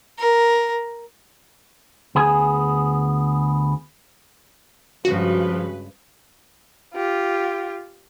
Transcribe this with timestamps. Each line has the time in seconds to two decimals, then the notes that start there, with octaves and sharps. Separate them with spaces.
0.19 A#4
2.15 D2 B3 G#4 G#5
5.05 G2 C#3 F3 G#3 F#4 B4
6.94 F4 G4